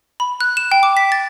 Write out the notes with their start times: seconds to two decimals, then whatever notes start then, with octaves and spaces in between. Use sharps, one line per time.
0.20 B5
0.41 F#6
0.57 E7
0.72 G5
0.83 D6
0.97 B6
1.12 A6